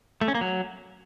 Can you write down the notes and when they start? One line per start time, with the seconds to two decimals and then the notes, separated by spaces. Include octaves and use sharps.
0.21 A3
0.28 C#4
0.35 A#3
0.41 F#3